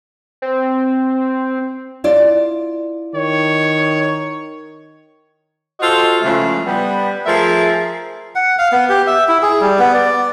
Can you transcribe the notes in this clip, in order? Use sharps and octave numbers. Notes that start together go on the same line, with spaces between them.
C4
E4 F4 D5
D#3 C#5
F4 F#4 A4 C5 D#5
C#3 E3 F3 G#3 A3
G3 B3
F3 A3 G#4 A#4 E5
F#5
F5
B3
G4
E5
E4
G#4
G3
B3
D5